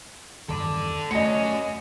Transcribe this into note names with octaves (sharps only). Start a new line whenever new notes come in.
E2 G2 D#3 A4 D5
A3 C#4 F#4 D#5 C#7